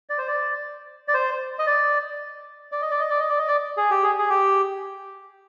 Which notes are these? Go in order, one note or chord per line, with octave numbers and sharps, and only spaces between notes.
D5
C5
D5
D5
C5
D#5
D5
D5
D#5
D5
D#5
D5
D#5
D5
D#5
D5
G#4
G4
G#4
G#4
G4